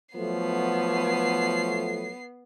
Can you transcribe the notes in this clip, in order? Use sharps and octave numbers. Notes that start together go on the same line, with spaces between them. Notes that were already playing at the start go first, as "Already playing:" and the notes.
F3 F#3 A3 B3 C7